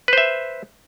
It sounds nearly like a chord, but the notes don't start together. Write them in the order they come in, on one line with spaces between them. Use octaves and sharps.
B4 C5 E5